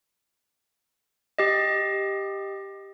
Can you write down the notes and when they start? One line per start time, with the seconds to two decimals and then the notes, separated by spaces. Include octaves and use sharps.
1.38 G4 D#5